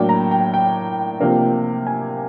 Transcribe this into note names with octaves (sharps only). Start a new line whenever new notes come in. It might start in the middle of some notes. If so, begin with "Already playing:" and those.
Already playing: A2 F#3 A#3 D4 G5
A#5
G5
G5
C3 F3 A#3 D4
G#5